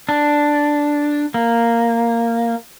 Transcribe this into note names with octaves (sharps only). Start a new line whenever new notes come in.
D4
A#3